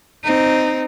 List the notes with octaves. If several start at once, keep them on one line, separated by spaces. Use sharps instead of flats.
C4 D#4